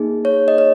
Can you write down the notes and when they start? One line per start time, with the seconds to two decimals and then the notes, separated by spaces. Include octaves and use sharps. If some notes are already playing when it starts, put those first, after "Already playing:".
Already playing: A#3 D#4 G#4
0.25 C#5
0.48 D#5
0.58 C#5